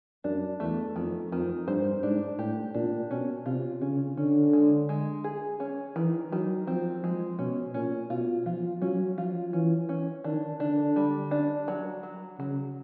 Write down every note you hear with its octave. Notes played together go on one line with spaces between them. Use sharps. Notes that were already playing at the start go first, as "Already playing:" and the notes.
F#2 D4
E2 A3
F2 D#3
F2 D#3
G2 C5
G#2 D4
A2 G4
A#2 D4
B2 C#4
C3 F4
C#3 C#4
D3 C#4
G#3
G#3
G#4
C#4
D#3 E3
D#3 F#3
F3 C4
F3 G#3
B2 C#4
A#2 C#4
B2 F4
F3 F4
F#3 C#4
F3 F4
E3 C#4
C#4
D#3 D4
D3 D4
G3
D4
F#3
F#3
C#3 F#3